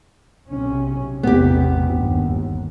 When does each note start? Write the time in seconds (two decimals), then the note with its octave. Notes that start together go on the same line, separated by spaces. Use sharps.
0.48 B1 C3 C#4
1.23 A1 E2 C3 B3 G4
1.91 G1 D#2